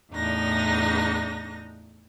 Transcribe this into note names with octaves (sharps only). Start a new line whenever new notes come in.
E2 A2 D4 D#4 A#6